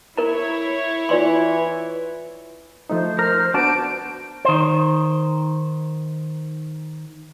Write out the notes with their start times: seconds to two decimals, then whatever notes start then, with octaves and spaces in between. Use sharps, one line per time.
0.18 E4 A#4 C#5 A#5
1.09 E3 F4 D5 C6
2.90 F3 A3 D#4 C5
3.19 A#4 F6
3.54 B3 D4 F#4 A5 D7
4.45 D#3 C5